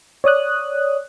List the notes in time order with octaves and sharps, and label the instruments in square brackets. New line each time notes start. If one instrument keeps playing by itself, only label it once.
[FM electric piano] C#5 D5 D#6 F#6